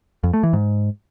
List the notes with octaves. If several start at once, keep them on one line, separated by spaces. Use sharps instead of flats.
F2
A3
E3
G#2